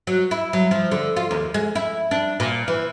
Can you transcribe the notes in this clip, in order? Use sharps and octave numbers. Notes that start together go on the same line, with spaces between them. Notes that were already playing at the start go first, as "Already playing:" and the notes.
F#3
E4
F#3
F3
D3
F4
D#2
G#3
E4
D4
A#2
E3